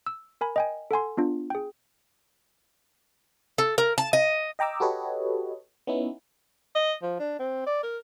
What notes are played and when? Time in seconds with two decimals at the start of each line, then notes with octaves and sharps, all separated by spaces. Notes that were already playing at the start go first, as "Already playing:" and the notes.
0.06 E6
0.41 A#4 G#5 B5
0.56 D#5 G5 G#5
0.91 A4 F#5 G#5 C6
1.17 B3 D4 F4
1.50 G#4 G5
3.58 A4
3.78 A#4
3.98 A5
4.13 D#5
4.59 D#5 G5 A#5 D6 E6
4.80 F#4 G4 A4 B4 C#5 D#5
5.87 B3 C#4 D#4 E4
6.75 D#5
7.03 F3
7.19 D4
7.39 C4
7.67 D5
7.83 A#4